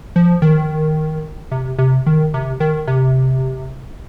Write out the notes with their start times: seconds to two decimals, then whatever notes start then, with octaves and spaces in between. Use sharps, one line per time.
0.16 F3
0.42 D#3
1.52 C3
1.78 C3
2.06 D#3
2.34 C3
2.60 D#3
2.87 C3